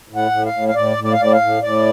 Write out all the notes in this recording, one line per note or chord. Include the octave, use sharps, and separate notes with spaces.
A2
F#5
A2
F5
A2
F5
A2 D5
A2
D5
F5
A2 D5
F5
A2
A2 D5